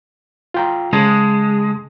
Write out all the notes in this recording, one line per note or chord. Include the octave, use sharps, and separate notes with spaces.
F4 G5 A#5
C#3 G#3 A5 G#6